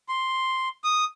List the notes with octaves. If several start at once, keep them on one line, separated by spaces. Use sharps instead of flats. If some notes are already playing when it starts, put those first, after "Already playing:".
C6
D#6